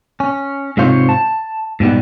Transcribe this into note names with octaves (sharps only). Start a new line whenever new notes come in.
C#4
G#2 C3 F4 C5 C#5
A5
G#2 B2 G3 B3